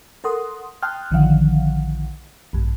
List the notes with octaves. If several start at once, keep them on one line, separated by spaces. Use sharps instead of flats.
A4 A#4 F#5 C6 D#6
G5 A5 C6 D#6 F6 F#6
A#1 D3 D#3 F3 F5 F#5
A#1 G2